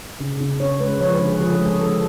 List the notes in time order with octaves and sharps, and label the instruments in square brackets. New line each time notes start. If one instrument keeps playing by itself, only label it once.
[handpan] C#3
C#3
C#3 C#5
G#3 B4
F3 C#5
B4
D3
G#4
F3 G#4
A4
G#3 G#4
G#3 A4